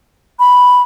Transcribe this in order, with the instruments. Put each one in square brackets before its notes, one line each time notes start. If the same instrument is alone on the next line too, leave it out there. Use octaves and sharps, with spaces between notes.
[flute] B5